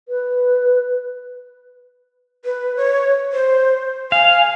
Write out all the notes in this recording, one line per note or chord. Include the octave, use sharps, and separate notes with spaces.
B4
B4
C#5
C5
F5 G#5